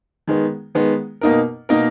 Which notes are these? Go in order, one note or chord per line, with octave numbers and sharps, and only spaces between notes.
D#3 G#3 B3
D#3 G#3 B3
B2 A#3 D#4 A#4
B2 A#3 D#4 A#4